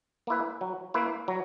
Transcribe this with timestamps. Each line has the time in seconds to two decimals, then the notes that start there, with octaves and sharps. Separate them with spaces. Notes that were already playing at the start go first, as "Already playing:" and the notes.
0.27 A#3 E4 B4
0.61 F#3
0.94 A#3 E4 B4
1.28 F#3